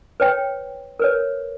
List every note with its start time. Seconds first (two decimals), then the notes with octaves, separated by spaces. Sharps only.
0.20 B4 C#5 G5
0.99 A#4 B4 C#5